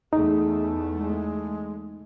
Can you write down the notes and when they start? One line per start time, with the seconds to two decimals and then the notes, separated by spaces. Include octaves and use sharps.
0.13 E2 A3 D#4 G#4
0.91 G#3